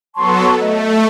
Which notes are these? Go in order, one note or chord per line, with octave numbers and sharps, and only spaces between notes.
F#3 B3 A4 A5 C6 C#6
A3 A4 D#5